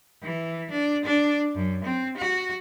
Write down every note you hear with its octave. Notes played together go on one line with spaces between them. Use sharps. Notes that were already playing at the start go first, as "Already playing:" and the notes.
E3
D4
D4
F#2
C4
F#4